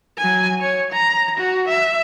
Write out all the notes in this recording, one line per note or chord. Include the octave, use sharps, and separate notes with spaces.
F#3 G#5
C#5
A#5
F#4
E5